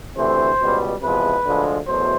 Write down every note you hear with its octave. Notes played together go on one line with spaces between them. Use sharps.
D2 C3 E3 A3 C5
C#2 B2 G3
E2 C3 F3 G#3 B4
D2 D3 F3 G#3
E2 B2 F#3 A3 C5